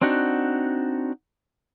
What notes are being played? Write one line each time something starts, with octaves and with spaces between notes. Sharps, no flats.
C4 D4 D#4 F#4 F#5